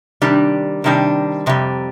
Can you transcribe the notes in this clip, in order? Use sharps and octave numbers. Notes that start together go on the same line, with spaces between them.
C3 D#3 G3 D4
C3 D#3 G3 D4
F2 C3 G3